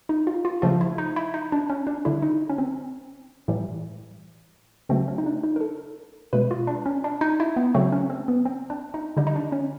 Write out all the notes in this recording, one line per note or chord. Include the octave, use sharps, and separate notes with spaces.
D#4
F4
F4
C#3 F3 A3 F4
E4
D#4
E4
D#4
D4
C#4
D4
D3 G3 E4
D#4
C#4
C4
A2 E3 G3
C#3 F#3 A3 C4
C#4
D#4
D4
D#4
A#4
A4
B2 G#3 B4
F4
D4
C#4
D4
D#4
E4
B3
C#3 F#3 A3 C4
C#4
C4
B3
C4
D4
D#4
D3 G3 D#4
D#4
D4
C#4